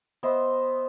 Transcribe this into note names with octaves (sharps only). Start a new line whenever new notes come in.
B3 C5 D#5 E5